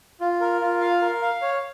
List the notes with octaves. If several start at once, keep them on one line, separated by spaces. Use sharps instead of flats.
F4
A#4
F4
F5
A#4
F5
C#5